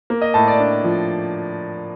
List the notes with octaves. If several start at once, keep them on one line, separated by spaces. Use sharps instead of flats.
A#3
D#5
A2 A5
D5
D4
F3